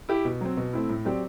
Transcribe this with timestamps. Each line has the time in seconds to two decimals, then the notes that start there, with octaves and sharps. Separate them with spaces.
0.09 E4 G4
0.25 B2
0.41 F#3 C4
0.57 B2
0.73 A3 C4 E4
0.89 A2
1.05 F#3 C4 G4 D5